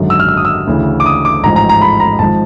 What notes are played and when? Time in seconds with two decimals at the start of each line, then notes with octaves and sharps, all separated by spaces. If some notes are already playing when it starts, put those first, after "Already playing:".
Already playing: G#1 F#2 D3 F#3
0.10 E6
0.20 F6
0.29 E6
0.37 D#6
0.45 E6
0.67 D2 C#3 E3
1.00 D6
1.06 D#6
1.25 D6
1.43 A1 G#2 F3 A#5
1.56 A#5
1.69 A#5
1.82 B5
2.00 A#5
2.19 G#1 G#2 F3 A5